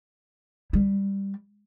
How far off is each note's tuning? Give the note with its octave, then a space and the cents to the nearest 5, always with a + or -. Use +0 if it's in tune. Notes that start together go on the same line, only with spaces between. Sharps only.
G3 +10